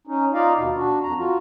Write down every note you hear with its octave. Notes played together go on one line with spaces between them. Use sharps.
C#4 D#4
D#4 F4 D5 D#5 F5
D#2 B2
D4 F#4
F2 A#5
F4 F#4